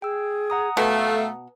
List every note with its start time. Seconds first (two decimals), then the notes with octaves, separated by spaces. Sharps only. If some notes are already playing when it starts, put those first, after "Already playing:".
0.02 G#4 G5 E6
0.50 F#5 A#5 D#6
0.77 B2 A3 F5